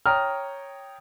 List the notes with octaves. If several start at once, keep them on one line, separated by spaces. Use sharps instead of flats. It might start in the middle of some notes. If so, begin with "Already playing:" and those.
C#5 G5 A#5 D#6 F6